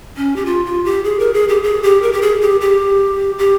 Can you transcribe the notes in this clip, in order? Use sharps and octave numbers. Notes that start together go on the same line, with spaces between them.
C#4
G4
F4
F4
G4
G#4
A#4
G#4
G4
G#4
G4
A#4
G4
G#4
G4
G4
G4